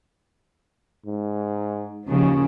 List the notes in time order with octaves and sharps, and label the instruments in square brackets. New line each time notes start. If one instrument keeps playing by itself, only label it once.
[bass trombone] G#2
[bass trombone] D#2 [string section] C#3 F3